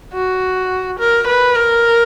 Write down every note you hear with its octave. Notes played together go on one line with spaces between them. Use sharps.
F#4
A#4
B4
A#4